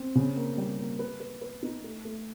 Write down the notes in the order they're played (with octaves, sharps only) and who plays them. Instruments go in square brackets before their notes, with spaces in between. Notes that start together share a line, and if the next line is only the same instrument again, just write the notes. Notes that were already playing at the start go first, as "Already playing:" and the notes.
Already playing: [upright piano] C4
C#3
A#3
G3
A#3
B4
B4
B4
D#4
A3
A3